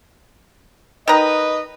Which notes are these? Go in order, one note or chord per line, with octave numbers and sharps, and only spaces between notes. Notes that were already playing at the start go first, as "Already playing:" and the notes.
D#3 B4 D#5 A#5